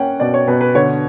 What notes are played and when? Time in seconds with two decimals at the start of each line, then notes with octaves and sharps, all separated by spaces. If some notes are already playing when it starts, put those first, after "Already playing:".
Already playing: A#3 C#4 F#5 G5
0.20 B2 D5
0.34 C#5
0.48 B2 B4
0.61 B4
0.75 D3 C#5